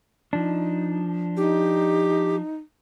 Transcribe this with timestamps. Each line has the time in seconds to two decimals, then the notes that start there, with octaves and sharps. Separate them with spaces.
0.33 F3 D4 D#4
1.37 D#4 G4